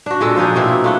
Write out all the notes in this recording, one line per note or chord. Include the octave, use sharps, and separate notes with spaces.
D4 F#4
A#2 G#3 A4
F3 D4 D#4 G#4
B2 A#3 C4 E4
A3 F4 F#5